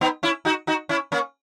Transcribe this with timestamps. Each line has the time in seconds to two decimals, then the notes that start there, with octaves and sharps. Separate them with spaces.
0.01 B3 D#4
0.23 C#4 E4
0.45 D#4 F#4
0.67 D#4 F#4
0.89 C#4 E4
1.12 A#3 C#4